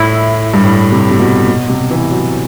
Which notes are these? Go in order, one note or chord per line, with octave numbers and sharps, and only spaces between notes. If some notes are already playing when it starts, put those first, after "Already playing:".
Already playing: A2 E4
G2
A2
C3
C3
B2
B2
C3
E3
F#3